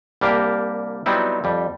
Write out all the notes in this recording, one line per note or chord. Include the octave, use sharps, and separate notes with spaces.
C2 G3 A#3 D4 G4 A#4
F#3 G3 B3 C4 D#4 E4
F2 G3